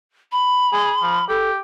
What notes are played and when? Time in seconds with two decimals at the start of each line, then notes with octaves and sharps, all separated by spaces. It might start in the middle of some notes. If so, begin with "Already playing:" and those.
0.32 B5
0.73 G#4
1.02 F3
1.29 G4 A4